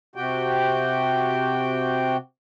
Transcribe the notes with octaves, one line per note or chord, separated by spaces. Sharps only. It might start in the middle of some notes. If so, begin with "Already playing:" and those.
C3 F#4 G4 G5